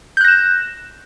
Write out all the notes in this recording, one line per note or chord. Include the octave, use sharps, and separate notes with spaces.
F#6 G6 A#6 E7